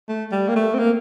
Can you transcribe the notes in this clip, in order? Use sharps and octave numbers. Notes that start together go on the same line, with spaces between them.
A3
G3
A#3
A3
C4
A#3